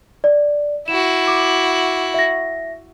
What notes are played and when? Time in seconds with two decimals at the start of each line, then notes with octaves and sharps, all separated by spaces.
0.24 D5
0.88 E4 F#4 E7
1.27 D6
2.14 E5 A#6